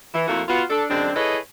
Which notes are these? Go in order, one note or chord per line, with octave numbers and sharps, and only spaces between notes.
E3
F2 F3 A3 A#3 E4 F#4
B3 F4 F#4
D4 A4
F#2 D3 G#3 C4 D4
E4 G#4 A4 B4 C#5 D#5